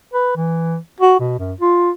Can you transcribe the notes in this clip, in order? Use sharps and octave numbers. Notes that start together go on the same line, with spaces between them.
B4
E3
F#4
B2
F#2
F4